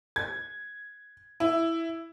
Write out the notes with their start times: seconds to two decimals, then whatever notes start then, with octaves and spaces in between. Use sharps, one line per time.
0.16 G#6
1.40 E4